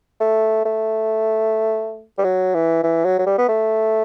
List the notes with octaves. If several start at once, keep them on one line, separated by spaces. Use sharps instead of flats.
A3
A3
G3
F#3
E3
E3
F#3
F#3
G3
B3
A3